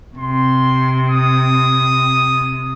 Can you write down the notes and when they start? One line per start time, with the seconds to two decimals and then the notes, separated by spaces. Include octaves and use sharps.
0.17 C3 C6
1.10 D#6